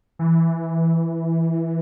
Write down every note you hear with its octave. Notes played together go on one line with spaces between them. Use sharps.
E3